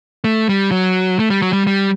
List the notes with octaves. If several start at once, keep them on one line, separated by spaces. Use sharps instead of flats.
A3
G3
F#3
A3
G3
F#3
G3
G3